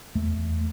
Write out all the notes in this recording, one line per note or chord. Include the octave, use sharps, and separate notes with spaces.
E2 A3
E2